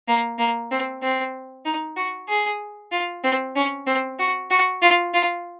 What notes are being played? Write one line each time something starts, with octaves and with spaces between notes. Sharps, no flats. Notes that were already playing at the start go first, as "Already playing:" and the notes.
A#3
A#3
C4
C4
D#4
F#4
G#4
F4
C4
C#4
C4
F#4
F#4
F4
F4